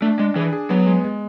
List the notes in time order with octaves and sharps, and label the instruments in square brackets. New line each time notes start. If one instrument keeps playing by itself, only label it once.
[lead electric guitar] A3 [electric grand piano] D4
[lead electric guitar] G#3 [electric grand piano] D4
[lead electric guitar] E3 [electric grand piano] G#4
[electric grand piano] G#4
[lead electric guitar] F#3 [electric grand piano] B3
[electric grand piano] G#3
G#3